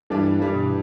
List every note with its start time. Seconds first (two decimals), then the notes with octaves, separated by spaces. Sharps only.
0.10 G2 E3 G3 D4
0.39 G2 E3 G3 D4
0.54 B2